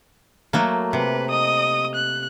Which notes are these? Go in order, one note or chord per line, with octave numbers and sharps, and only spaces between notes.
F#3 A3 A#3
C3 B4
D#5 D#6
F#6